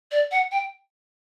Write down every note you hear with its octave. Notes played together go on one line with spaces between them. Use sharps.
D5
F#5
G5